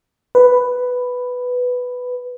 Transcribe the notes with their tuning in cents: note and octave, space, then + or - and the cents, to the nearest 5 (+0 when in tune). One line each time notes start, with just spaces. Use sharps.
B4 +5